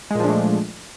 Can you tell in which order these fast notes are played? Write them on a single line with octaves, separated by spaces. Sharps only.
G#3 A#2 F3 D4 A3